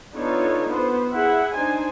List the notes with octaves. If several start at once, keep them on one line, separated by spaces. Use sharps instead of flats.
B3 D4 D#4 F4 A4 C#5
B3 C5
E4 G#4 E5 F#5
D4 D#4 C5 G#5